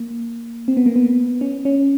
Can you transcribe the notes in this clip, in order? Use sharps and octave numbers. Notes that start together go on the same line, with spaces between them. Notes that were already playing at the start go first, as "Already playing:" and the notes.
Already playing: A#3
C4
B3
A#3
B3
C#4
C#4